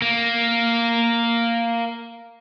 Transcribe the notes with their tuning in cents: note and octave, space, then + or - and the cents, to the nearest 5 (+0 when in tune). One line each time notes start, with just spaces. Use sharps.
A#3 -5